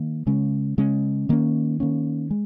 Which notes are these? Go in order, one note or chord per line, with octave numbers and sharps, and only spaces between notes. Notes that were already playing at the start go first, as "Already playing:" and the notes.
Already playing: D#3 A#3
C#3 G#3 C#4
C#3 G#3 C#4
D#3 A#3 C#4
D#3 A#3 C#4
G#3